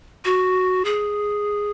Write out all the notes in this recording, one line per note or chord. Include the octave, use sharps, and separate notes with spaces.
F#4
G#4